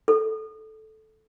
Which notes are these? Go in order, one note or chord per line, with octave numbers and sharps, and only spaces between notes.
A4